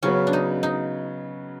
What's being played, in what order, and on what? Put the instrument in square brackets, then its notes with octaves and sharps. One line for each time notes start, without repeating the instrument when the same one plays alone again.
[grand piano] C#3 F#3 B3 [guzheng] C#4
[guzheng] D4
D#4
D#4